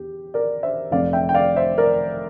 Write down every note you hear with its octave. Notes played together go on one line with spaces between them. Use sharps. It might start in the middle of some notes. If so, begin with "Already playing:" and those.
Already playing: E2 G4
A#4 D5
C5 E5
F1 F2 C3 D5 F5
E5 G5
G5
D5 F5
C5 E5
A#4 D5